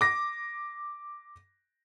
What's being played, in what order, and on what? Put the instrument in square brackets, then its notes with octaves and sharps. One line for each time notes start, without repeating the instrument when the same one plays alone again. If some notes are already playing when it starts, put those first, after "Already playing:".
[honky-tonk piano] D6 A#6